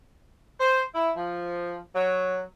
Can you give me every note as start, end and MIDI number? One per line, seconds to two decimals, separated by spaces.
0.58 0.80 72
0.94 1.09 64
1.15 1.76 53
1.94 2.41 54